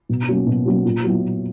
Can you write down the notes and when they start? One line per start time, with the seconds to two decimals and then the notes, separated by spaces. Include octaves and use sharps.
0.09 B2
0.29 F#3 A#3 C#4 F#4
0.47 B2
0.65 F#3 A#3 C#4 F#4
0.85 A#2
1.04 F#3 B3 E4
1.23 A#2